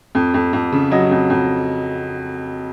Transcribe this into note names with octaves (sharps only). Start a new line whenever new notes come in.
F2
F2
F2
C#3
F#3 D#5
F2
F2